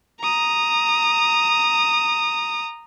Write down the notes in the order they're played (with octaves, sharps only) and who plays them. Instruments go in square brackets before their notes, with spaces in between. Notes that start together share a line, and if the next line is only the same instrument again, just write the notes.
[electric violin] A#5 D#6